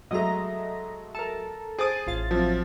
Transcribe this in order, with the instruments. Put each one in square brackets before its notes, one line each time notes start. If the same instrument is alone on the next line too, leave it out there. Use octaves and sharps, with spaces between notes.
[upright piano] F#3 G#3 A3 [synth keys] D#5 A#5
[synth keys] A4 A#4
[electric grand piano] G#4 [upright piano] C5 [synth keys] D#6 A6 D7
[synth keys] A1 F4 A6
[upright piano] C3 F#3 [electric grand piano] F3